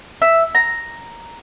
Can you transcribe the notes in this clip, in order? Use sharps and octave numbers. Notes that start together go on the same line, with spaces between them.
E5
A#5